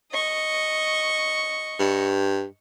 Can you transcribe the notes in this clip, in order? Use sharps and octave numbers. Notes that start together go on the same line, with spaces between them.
D#5 C#6
G2